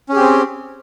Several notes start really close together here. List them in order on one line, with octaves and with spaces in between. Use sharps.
C#4 G#4 G4 C4